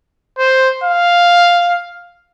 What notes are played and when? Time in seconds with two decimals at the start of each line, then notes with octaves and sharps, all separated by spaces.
0.38 C5
0.84 F5